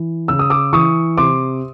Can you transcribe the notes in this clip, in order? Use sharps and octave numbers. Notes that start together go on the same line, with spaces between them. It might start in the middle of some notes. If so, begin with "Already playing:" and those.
Already playing: E3
C#3 E6
D#6
D6 E6
E3 C#6 D#6
C3 C6 D6